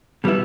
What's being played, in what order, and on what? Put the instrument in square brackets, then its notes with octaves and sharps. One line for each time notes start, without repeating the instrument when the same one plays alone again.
[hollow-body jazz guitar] B2 G3 B3 E4